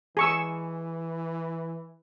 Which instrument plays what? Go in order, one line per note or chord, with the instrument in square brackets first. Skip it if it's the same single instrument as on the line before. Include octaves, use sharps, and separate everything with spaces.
[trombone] E3 [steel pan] G#4 C#6 E6